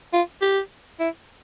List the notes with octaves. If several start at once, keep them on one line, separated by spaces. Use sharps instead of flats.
F4
G4
E4